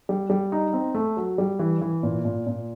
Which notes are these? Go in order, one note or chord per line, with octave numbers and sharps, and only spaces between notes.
G3
G3
D#4
C4
A3
F#3
G3
E3
E3
A#2
A#2
A#2